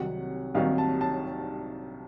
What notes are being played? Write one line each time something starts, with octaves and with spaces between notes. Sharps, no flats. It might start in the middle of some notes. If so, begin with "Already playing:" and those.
Already playing: C2 C3 D#3 F#3 F#5
C2 C3 D#3 F#3 F5
A5
A5